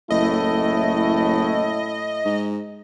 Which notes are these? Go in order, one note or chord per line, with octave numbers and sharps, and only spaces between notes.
F#1 A2 A3 E4 D#5
G#2